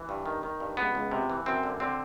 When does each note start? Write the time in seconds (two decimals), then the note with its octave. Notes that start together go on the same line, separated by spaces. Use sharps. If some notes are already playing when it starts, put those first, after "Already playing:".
Already playing: E3
0.09 G2
0.26 D#3
0.43 D#3
0.60 G2
0.77 C#2 B3
0.95 C#2
1.11 C3
1.30 E3
1.46 F#2 C4
1.63 D3
1.80 D3 C4